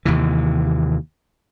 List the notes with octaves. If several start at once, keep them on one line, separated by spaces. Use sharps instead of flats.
D#2 C3 E3